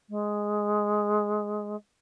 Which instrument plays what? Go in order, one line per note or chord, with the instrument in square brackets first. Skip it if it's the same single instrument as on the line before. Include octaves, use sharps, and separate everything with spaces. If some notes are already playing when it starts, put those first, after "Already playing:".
[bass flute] G#3